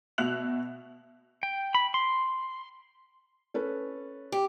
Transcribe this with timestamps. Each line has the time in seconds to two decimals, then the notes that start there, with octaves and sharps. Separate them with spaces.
0.18 B2 F#4 E5 F#6 F7 F#7
1.43 G5
1.75 B5
1.94 C6
3.54 C#4 A4 B4
4.32 G4